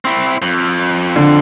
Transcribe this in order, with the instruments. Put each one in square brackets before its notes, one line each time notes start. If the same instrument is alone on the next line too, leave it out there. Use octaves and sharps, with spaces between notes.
[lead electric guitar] C4 E4
F2
[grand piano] D3